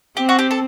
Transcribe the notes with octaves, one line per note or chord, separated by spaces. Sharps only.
C4 G4
F#4
G4
A4